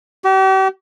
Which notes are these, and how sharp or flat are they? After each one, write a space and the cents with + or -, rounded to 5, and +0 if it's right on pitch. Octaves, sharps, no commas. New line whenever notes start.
G4 -40